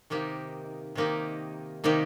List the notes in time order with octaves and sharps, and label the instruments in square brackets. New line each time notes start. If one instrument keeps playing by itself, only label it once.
[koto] C3 D#3 A#3 D#4 G4
C3 D#3 A#3 D#4 G4
C3 D#3 A#3 D#4 G4